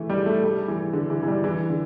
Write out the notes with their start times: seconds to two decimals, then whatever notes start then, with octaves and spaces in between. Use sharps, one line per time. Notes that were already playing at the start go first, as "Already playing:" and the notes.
Already playing: E3 A3
0.10 G3
0.26 A3
0.44 G3
0.68 E3
0.93 D3
1.10 E3
1.23 E3
1.28 G3
1.44 E3
1.70 D3